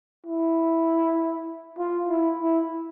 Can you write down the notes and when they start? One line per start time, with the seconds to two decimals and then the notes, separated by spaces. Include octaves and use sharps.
0.26 E4
1.78 F4
2.09 E4
2.39 E4